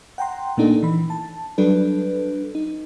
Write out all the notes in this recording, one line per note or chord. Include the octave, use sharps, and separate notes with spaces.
F#5 G5 A#5 C6
A#2 A3 A#3 D4 D#4 A4
E3 B5
A5
F#3 G3 D4 A4 B4
D#4